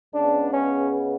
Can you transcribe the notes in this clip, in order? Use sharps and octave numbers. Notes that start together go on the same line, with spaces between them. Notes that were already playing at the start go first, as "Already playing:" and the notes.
C#2 C#3 G#3 B3 D4
C#4